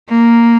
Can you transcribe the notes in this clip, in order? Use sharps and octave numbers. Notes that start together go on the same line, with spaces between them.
A#3